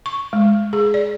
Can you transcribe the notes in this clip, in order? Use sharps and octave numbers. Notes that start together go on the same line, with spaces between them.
C#6
G#3
G#4
D5